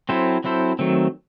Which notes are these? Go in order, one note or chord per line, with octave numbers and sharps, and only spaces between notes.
F#3 C4 E4 A4 C5
F#3 C4 E4 A4 C5
D#3 F#3 A3 C4